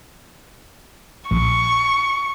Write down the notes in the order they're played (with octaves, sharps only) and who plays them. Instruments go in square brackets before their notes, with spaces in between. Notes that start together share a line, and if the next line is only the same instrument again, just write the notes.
[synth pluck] A#1 [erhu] C#6